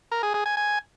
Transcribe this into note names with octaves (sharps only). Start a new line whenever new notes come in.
A#4
G#4
G#4
G#5
G#5